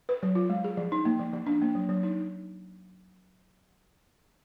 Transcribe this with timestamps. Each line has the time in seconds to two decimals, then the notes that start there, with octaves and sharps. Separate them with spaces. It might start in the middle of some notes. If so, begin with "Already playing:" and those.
0.09 B4
0.23 F#3
0.35 F4
0.49 G#3
0.64 G#4
0.77 F3
0.92 D#4
1.05 A#3
1.19 F3
1.33 F3
1.47 D4
1.62 A#3
1.75 F#3
1.89 F#3
2.03 D#4